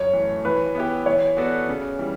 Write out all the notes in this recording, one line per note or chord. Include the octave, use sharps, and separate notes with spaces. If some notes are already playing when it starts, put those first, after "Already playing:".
Already playing: F#2 C#5
E3 A3
E3 B4
B3 E4 G4
E3 C#5
B3 F#4 A4 D5
C#3
E3 G3